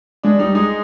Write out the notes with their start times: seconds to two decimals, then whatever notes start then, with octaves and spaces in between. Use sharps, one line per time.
0.23 G#3 D4
0.39 G3 D#4
0.55 G#3 D#4